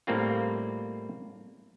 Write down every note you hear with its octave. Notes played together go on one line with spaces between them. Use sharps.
A2 G3 A#3 C4 F4